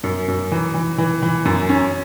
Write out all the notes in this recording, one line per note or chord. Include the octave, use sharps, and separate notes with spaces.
F#2
F#2
E3
E3
E3
E3
F#2
C#4